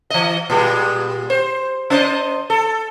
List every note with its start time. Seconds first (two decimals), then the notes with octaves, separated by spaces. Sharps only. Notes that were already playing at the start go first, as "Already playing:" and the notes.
0.10 E3 D#5
0.50 A#2 G3 G#3
1.30 C5
1.90 C#4 C5 D#5
2.50 A4